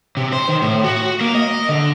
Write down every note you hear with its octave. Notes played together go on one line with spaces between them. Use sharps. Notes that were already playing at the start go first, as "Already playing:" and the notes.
C3
C5
D#3
A2
F#4
A#3
D#5
D3